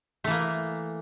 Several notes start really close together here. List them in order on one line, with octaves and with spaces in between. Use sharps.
A3 E3 A#3